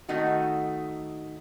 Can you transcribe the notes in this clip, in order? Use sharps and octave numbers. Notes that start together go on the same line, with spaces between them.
D#3 A3 D#4 F#4